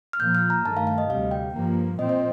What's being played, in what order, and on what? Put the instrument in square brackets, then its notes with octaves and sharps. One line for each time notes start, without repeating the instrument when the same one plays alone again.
[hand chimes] F6
[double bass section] A#2 F3 A#3 [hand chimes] G6
[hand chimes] F6
A#5
[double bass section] G2 D#3 A3 [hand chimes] A5
[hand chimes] F5
F5
D#5
[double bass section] D2 C3 G3 [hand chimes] F5
[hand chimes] G5
[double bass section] G2 F3 A#3
[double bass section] A#2 F3 C4 [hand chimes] D#5
[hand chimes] D#5